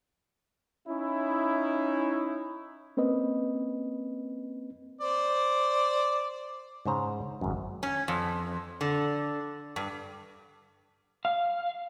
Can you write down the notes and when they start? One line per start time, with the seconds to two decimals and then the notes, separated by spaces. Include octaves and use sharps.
0.87 C#4 D#4 E4
2.97 A#3 C4 C#4 B4 D#5
5.01 C5 D5
6.86 G#2 C#3 C5 A#5
7.41 G#1 F#2
7.83 C#4
8.08 F2
8.81 D3
9.76 G2
11.25 F5